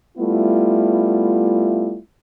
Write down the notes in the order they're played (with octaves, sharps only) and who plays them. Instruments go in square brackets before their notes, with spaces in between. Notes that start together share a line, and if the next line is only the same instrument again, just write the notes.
[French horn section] G3 A3 B3 E4 F4